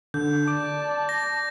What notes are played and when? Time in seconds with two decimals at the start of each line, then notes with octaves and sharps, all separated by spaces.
0.14 D3 G6
0.48 D5 A5 D6
1.09 A#6